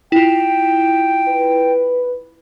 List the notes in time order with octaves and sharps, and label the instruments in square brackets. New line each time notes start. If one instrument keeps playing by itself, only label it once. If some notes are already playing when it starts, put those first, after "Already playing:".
[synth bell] E4 F4 [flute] G5
[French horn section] B4